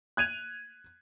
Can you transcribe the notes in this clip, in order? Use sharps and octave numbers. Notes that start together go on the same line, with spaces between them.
F#6 G#6 D#7 F7